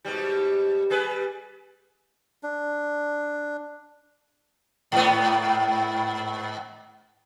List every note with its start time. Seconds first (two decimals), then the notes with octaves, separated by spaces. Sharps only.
0.05 G#2 B2 G3
0.90 G3 G#4 B4
2.43 D4
4.92 G#2 B3